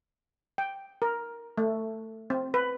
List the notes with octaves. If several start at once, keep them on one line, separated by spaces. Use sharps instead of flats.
G5
A#4
A3
C4
B4